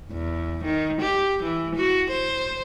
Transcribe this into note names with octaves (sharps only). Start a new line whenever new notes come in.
E2
D#3
G4
E3
F#4
C5